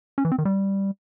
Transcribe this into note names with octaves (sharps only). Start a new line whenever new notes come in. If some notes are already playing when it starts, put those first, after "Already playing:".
C#4
E3
C4
D#3
G3